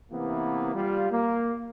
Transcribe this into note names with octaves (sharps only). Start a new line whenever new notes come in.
C3 E3 A#3 B3
G3 F4
A#3